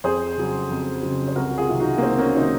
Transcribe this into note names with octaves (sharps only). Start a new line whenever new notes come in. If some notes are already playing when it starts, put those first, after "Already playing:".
F2 G#4 C5
C#3 F#3
F2
C#3 F#3
C5
C2 F#4 A#4
F#4
F4 G#4
C3 D#3 F#3
D#4 F#4
A#3
C2 C4
A#3 C#4
C3 D#3 F#3 C4 D#4